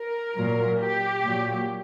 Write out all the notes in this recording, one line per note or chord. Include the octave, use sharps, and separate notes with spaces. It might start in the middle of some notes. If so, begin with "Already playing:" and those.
Already playing: A#4
A#2 F#3
G4
A#2 F#3